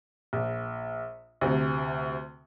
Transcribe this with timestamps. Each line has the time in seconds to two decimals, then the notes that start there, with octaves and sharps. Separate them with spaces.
0.33 A#1
1.41 D2 C3